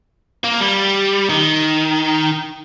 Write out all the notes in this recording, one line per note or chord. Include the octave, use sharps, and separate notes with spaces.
A#3
G3
D#3